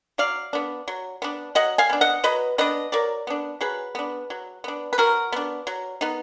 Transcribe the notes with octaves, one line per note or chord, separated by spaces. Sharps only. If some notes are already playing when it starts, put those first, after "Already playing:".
F#3 D5 F5
B3 D4
F#3
B3 D4
F#3 D#5 F#5
F5 G#5
B3 D4
D#5 F#5
F#3 B4 D#5
B3 D4 B4 D#5
F#3 A#4 D5
B3 D4
F#3 G#4 B4
B3 D4
F#3
B3 D4
B4
F#3 F#4 A#4
B3 D4
F#3
B3 D#4